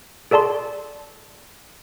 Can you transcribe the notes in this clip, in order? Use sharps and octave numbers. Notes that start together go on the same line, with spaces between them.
G#4 A4 D5 A5 C6